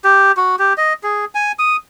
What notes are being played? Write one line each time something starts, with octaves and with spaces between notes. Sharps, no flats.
G4
F#4
G4
D#5
G#4
G#5
D#6